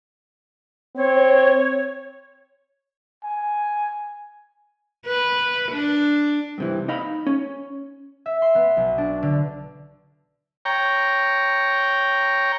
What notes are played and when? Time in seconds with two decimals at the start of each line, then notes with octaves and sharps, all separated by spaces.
0.96 C4 C#5
3.24 G#5
5.06 B4
5.72 D4
6.58 G2 C3 E3
6.88 D#4 D#5 F5 B5
7.27 C#4
8.26 E5
8.42 C6
8.55 B3
8.77 B1
8.98 D4
9.23 D3
10.65 C#5 G5 A#5